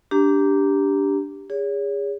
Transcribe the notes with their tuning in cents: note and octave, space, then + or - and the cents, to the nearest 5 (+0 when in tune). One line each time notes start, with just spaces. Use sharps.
D4 -15 G4 +0 A#5 -5
G#4 -30 C#5 +35